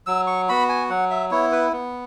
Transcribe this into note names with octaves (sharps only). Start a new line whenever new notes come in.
F#3 E6
C#6
B3 F#4 B5
G#5
F#3 F#5
E5
B3 E4 C#5
B4
B3